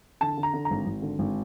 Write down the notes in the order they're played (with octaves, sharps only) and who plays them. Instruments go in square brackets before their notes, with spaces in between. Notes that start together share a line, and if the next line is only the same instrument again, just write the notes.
[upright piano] D3 A5
D3
A#5
D3
A#5
G#1
G#1
D3
G#1